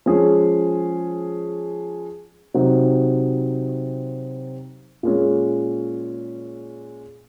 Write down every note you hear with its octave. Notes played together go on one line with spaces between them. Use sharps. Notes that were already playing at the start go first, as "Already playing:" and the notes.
F3 G#3 C#4 G#4
C3 F#3 C4 D#4 F#4
A#2 G#3 C#4